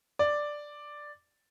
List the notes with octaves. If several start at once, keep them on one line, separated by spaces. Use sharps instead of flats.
D5